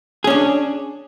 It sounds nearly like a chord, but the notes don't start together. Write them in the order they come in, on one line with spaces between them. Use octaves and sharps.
G#4 C#4 D4